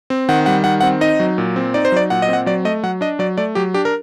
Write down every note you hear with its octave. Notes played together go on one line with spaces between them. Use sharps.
C4
D#3 F#5
G3 F#5
D#3 F#5
C4 F#5
D#4 D#5
F#3
A#2
C4
D#4 D5
C5
F#3 D5
A#2 F#5
D#5
C4 F#5
F#3 D5
A3 D#5
F#3 F#5
D4 D#5
F#3 D5
A3 D5
F#3 G4
D4 G4
A#4